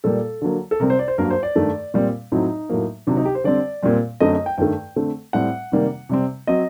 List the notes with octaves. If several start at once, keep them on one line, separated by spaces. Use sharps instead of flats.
A#2 G3 A#3 A4
D3 F#3 A#3
A4
C3 G3 C4 A#4
C5
D5
C5
G2 F#3 A#3 A#4
C5
D5
G2 D#3 A3
A#2 G3 C4
A2 F#3 C4 D#4
A2 F#3 A#3
C3 D#3 F#3 D4
D#4
G4
C5
D3 G3 C4 D5
A#2 G3 C4
F#2 D3 A3 C4 D#5
D#5
G5
G2 D#3 A3 G5
D3 A3 C4
A2 G3 C4 F#5
C3 D#3 G3 A#3
C3 G3 C4
F#3 C4 D#5